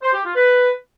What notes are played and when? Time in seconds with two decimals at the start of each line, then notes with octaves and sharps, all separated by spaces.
0.03 C5
0.14 G4
0.25 F4
0.36 B4